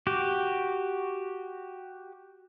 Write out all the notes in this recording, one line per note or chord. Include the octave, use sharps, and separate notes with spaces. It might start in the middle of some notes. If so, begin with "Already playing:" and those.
F#4 G4